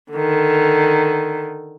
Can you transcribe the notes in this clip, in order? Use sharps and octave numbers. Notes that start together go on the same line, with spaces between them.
D3 D#3